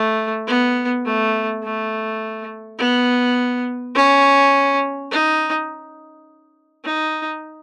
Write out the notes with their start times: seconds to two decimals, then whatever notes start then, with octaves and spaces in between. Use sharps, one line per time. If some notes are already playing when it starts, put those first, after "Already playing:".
Already playing: A3
0.47 B3
1.05 A3
1.63 A3
2.79 B3
3.95 C#4
5.11 D#4
6.85 D#4